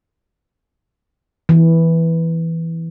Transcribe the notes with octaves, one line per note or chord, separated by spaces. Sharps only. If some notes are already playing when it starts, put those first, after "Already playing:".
E3